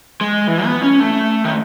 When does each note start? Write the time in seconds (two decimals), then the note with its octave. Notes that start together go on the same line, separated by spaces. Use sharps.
0.21 G#3
0.47 E3
0.65 B3
0.82 C#4
1.00 A3
1.45 D#3